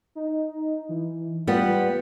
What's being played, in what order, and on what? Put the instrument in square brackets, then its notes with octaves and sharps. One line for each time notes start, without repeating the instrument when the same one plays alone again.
[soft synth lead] D#4
E3
[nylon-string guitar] G3 B3 [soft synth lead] F4